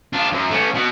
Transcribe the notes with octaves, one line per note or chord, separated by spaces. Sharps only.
D4 F4
F#2
A3 C#4
B2